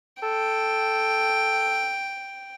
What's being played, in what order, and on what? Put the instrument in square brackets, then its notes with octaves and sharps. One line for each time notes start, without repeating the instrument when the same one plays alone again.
[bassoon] A4 [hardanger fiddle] G5